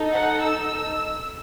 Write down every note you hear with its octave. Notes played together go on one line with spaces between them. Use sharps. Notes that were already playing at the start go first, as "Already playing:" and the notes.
Already playing: D#4 A4
F#5
E6